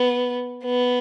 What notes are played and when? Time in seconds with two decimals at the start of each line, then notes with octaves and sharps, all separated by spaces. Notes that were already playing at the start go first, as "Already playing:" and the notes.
Already playing: B3
0.64 B3